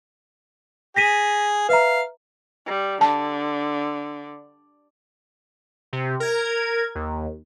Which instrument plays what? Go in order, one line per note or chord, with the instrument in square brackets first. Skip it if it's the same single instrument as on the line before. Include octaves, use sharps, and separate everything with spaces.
[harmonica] G#4 [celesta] A#6 B6 D#7
[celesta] B4 E5 A#5 [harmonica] F5
[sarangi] G3
[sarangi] D3 [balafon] A5
[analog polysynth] C3
A#4 G#6
D#2